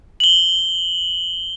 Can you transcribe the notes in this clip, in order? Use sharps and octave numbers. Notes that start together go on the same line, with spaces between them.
F#7 G7